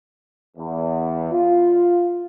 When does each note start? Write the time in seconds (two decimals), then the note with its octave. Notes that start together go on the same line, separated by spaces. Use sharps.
0.57 E2
1.32 F4